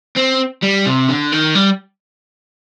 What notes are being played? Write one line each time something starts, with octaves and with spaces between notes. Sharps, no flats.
C4
G3
C3
D3
D#3
G3